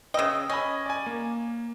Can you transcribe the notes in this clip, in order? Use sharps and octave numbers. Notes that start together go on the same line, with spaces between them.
C#3 D#5 G5 E6
C#4 D#5 G#5 B5
D5 G#5
A#3